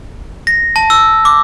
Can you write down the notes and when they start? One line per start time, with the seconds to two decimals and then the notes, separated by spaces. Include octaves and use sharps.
0.47 A#6
0.76 A5
0.90 E6
1.25 D6